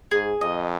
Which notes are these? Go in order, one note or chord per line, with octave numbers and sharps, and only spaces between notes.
G#2 G#4
F2 D#5